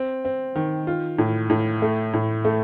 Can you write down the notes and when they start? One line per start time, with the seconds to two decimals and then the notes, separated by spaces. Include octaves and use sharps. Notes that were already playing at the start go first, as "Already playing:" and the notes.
Already playing: C4
0.25 C4
0.56 D#3
0.87 F4
1.18 A2
1.50 A2
1.82 A3
2.14 A2
2.45 A3